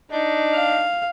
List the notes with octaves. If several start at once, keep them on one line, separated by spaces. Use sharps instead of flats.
D4 D#4
F5